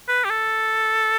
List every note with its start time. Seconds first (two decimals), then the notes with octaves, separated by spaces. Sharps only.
0.08 B4
0.24 G4
0.30 A4